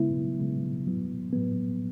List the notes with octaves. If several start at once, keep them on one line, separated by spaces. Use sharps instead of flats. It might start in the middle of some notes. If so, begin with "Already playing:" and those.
Already playing: C#3 G#3 B3 E4
C#3 G#3 B3
A2 F#3 B3
A2 F#3 B3